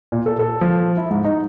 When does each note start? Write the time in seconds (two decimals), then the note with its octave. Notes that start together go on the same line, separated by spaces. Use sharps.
0.12 A#2
0.26 A4
0.39 A4
0.61 F3
0.97 E4
1.10 G#2
1.25 D#4